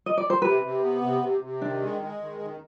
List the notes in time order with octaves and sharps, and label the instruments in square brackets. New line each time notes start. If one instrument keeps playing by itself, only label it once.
[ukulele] D#5
D5
C5
[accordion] C3 [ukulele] B4
[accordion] C3
B3
C3
C3
C3
[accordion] D#3 [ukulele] D4
[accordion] G#3
G#3
D#3
D#3